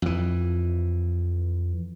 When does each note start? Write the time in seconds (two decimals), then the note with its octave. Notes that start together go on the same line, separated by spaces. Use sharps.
0.02 F2 E3